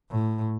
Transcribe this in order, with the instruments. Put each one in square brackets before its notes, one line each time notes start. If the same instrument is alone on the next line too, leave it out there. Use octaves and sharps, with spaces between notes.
[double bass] A2